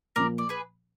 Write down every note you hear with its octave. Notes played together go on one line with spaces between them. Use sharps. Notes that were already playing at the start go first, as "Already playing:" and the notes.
A#2 F3 A#3 A#4 D5
D5
G#4 B4